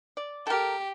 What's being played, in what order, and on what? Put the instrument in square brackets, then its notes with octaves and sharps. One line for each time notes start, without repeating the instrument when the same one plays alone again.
[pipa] D5
[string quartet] G4 [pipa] A4 A#4